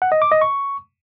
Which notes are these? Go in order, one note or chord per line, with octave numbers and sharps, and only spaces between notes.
F#5
D#5
D6
D#5
C#6